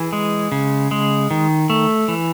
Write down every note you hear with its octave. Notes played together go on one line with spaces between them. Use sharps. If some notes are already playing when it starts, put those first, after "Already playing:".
Already playing: E3 G#4
G#3
C#3
G#3
D#3
A3
E3